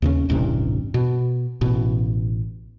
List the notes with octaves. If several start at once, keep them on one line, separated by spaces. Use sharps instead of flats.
D#2 C#3 C#4
D#1 A1 G2 C3
B2
A1 B2